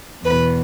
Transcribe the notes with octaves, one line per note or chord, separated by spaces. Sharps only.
E2 B2 B4